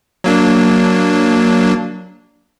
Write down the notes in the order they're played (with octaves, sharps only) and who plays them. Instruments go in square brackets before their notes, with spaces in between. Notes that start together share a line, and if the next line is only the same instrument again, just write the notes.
[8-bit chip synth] F#3 A#3 D4